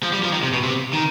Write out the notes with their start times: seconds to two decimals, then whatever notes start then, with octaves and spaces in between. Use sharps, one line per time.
0.03 F3
0.13 G3
0.23 F3
0.33 D#3
0.43 C3
0.53 B2
0.63 C3
0.93 D#3